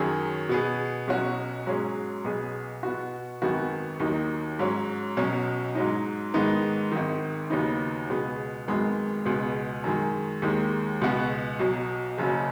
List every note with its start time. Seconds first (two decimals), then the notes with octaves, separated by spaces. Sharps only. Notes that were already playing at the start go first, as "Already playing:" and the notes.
Already playing: F#2 D#3 F#3 C#4 G#4
0.49 B2 B3 G#4
1.07 B1 B2 F#3 C#4 F#4
1.66 G#2 F#3 C#4 G#4
2.24 B1 B2 B3 G#4
2.83 B2 B3 F#4
3.42 G#1 F#2 D#3 B3 F#4
4.00 D#2 D#3 F#3 D#4
4.59 G#2 F#3 C#4
5.17 B1 B2 F#3 C#4
5.75 G#2 F#3 D#4
6.34 G#2 D#3 G#3 B3 D#4
6.92 G#1 G#2 D#3
7.50 D#2 C#3 F#3 B3 D#4
8.10 C#2 B2 B3 G#4
8.68 G#1 F#2 D#3 G#3 B3
9.25 C#2 B2 B3 G#4
9.84 F#2 D#3 G#3
10.42 D#2 D#3 G#3
11.01 C#2 B2 B3 F#4
11.59 B1 B2 F#3
12.18 F#1 F#2 C#3 F#3